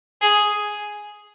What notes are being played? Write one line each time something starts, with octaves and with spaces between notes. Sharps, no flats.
G#4